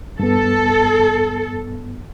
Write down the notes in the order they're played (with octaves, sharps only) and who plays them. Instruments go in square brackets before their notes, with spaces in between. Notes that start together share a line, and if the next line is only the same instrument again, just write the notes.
[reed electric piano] G2 B3 [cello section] A4